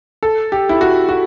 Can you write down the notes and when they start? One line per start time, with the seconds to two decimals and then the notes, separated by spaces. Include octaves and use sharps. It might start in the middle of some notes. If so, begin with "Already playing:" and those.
0.23 A4
0.52 G4
0.69 E4
0.81 F#4
1.09 F#4